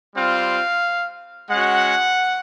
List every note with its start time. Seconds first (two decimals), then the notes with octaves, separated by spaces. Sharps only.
0.15 G3 C4 F4 F5
1.50 G#3 C#4 F#4 F#5